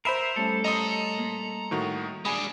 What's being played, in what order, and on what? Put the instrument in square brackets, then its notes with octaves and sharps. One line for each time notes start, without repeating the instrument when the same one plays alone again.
[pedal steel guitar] A#4 E5 [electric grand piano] C5 B5 C7
[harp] G3 A3 C#4 [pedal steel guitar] A4
[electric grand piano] D#5 D#6 [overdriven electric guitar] A#5 C6
[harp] A#3
[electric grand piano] A2 D#3 F#4
[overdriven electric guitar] G#3 D4 [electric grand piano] G#5 B5 D#6